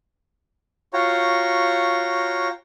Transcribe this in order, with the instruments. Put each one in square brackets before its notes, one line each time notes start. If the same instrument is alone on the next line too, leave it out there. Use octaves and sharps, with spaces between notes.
[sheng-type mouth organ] F4 F#4 C#5 G5 A#5